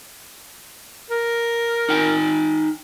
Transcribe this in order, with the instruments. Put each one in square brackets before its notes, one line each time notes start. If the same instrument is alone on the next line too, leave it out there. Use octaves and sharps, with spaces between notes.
[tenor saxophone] A#4
[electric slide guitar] D#4 G5 G#5